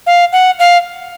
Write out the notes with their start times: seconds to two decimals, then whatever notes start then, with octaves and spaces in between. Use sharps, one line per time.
0.07 F5
0.32 F#5
0.59 F5